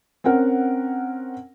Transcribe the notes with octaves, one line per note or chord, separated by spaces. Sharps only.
C4 C#4 A#4 F#5